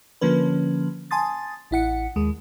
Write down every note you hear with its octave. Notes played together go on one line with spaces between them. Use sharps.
D3 F3 A#3 C#4 B4
G#5 A5 C6 D#6 A6
A1 E4 F#5 C#7
D#2 G#3